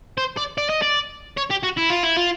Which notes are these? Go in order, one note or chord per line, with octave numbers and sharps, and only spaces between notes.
C5
D5
D5
D#5
D5
C#5
G4
F#4
E4
F4
E4
F4